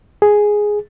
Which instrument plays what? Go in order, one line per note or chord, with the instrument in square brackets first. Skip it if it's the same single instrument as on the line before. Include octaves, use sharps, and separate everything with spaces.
[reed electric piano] G#4